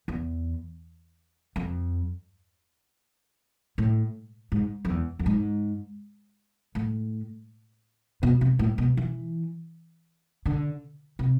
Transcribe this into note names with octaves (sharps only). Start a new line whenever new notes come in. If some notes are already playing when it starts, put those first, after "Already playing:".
E2
F2
A2
G#2
F2
E2
F2
G#2
A2
B2
C3
A2
B2
E3
D3
C3